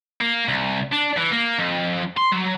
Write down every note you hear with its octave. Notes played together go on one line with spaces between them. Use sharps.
A#3
C2
D4
E3
A#3
F2
C6
F#3